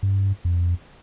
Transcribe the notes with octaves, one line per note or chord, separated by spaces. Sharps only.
G2
F2